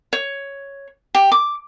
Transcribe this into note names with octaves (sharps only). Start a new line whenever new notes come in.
C#5
G4
D6